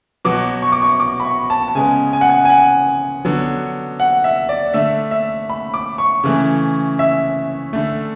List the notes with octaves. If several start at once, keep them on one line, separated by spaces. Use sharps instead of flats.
B2 F#3 B3 D6
C#6
D6
C#6
D6
B5
C#6
A5
A5
C#3 G#3 B3 G#5
G#5
F#5
G#5
G#5
F#5
D3 F#3 B3
F#5
E5
D5
D3 A3 E5
E5
B5
D6
C#6
C#3 E3 A3
E5
D3 A3